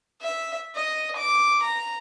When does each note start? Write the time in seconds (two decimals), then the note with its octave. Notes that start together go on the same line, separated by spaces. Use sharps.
0.22 E5
0.76 D#5
1.17 D6
1.64 A#5